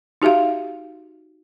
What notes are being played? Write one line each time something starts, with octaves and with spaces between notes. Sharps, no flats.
D#4 F#4 G4 E5 F5